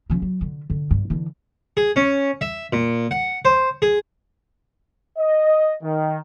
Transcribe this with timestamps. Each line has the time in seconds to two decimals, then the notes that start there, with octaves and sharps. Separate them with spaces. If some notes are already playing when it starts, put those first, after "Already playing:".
0.10 C#3 F3
0.22 F#3
0.41 D3
0.70 D3
0.91 G2
1.10 D3 E3
1.77 G#4
1.96 C#4
2.41 E5
2.73 A#2
3.11 F#5
3.45 C5
3.82 G#4
5.19 D#5
5.83 D#3